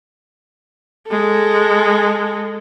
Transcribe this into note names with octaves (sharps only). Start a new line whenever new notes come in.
G#3 A4